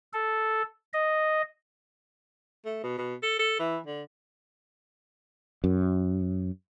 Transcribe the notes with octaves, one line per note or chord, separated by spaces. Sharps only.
A4
D#5
A3
B2
B2
A4
A4
E3
D3
F#2